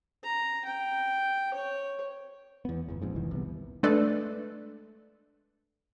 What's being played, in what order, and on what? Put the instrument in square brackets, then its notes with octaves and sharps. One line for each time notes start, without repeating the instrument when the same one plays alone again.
[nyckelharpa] A#5
G5
C#5
[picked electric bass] E2 B3
G1 E2
A#1 F2 G#2
F1 C2 D#3 E3
C2 B3
[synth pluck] G#3 A3 D4 A4 B4 D5